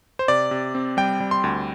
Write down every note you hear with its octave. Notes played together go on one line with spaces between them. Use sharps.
C5
C3 D5
C3
C4
G3 G5
G3
C6
D2